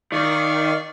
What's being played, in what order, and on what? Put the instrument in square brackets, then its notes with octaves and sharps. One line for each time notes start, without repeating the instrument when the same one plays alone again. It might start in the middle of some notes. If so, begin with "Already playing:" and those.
[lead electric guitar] D#3 [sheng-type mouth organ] D5 F5 C#6